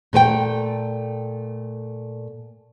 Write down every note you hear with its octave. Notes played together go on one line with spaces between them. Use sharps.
A#2 A3 B4 G5